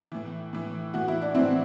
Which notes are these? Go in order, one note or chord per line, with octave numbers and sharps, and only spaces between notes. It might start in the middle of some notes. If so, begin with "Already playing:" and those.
A2 E3
A2 E3
A2 E3 F#4
E4
D4
A2 E3 C4 E4